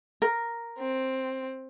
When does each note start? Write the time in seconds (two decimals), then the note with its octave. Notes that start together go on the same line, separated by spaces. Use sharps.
0.22 A#4
0.79 C4